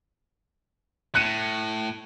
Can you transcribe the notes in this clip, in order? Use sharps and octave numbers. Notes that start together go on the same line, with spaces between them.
A2 F#6 C#7 D#7